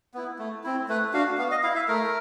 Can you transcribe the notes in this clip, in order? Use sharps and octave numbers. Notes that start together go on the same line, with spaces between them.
B3 E4
A3
C4 E4
A3 B4
D4 F#4 F5
B3 F5
D#5
E4 F5
E5
A3 A#4